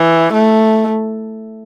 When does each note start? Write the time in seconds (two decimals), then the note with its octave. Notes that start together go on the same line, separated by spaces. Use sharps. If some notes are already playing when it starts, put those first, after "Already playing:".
Already playing: E3
0.33 A3